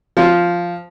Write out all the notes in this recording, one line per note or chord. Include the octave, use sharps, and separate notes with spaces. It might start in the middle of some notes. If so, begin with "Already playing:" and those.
F3